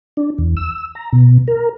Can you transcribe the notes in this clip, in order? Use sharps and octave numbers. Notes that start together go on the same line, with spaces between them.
D4
E2
E6
A#5
B2
A#4